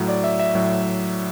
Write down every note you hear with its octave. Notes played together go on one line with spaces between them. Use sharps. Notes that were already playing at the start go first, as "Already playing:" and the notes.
Already playing: A2 F#3
D5
E5
E5
A2 F#3